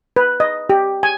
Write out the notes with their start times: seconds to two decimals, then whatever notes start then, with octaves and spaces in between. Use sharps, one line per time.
0.16 B4
0.40 D#5
0.70 G4
1.03 G#5